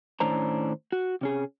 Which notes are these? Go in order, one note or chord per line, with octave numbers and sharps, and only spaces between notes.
A2 D#3 C#4 D4 C5 A#5
F#4
C3 C#4 G#4